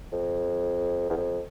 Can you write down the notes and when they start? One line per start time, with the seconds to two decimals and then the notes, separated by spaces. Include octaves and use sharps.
0.12 F2
1.10 E2
1.17 F2